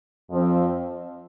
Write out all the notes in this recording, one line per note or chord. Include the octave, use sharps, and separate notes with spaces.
F2 F3 C4